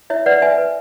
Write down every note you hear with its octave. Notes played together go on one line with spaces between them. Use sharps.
E4 C#5 E5
B4 D5 F#5
B4 E5 G#5
B4